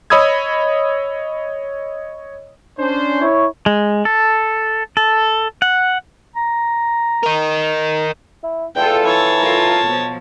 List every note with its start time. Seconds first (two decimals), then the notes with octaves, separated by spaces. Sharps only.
0.10 C#5 D#5 B5 D#6 E6 G#6
2.78 C#4 D4 C5
3.21 E4 C#5
3.66 G#3
4.05 A4
4.97 A4
5.62 F#5
6.36 A#5
7.23 A#4 D#5
8.44 E4
8.76 E2 F4 A4 G5
9.05 E3 C#5 A5
9.39 F4 A4 A#4
9.83 B2 F3